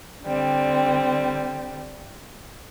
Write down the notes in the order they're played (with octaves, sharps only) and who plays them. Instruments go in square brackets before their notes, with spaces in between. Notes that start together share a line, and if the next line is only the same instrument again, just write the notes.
[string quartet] D3 G3 C4